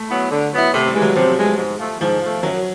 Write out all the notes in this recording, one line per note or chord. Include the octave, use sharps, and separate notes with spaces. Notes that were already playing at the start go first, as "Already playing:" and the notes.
Already playing: A3
F#3 B3 E4
D3
F#3 B3 E4
C3 A3
G3
E3 G#3
F#3
C3 F3
E3 G#3
G#2
F3 A3
G#2 F3
F3 A3
F#2 F#3